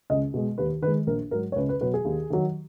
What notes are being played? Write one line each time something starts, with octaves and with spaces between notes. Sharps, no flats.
C#2 D#5
B2 G#3
D#2 B4
D#3 B4
G#3
A#1 A#4
G#2 F#3 A#4
C#5
C#2 B4
B4
B2 F#3 B4
G#4
D#2
D#3 F#3